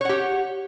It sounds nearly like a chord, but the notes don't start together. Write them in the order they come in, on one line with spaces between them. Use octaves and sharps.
C#5 F#5 G4